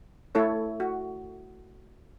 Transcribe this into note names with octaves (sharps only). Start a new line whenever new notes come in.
A3 E4 A4 C#5
F#4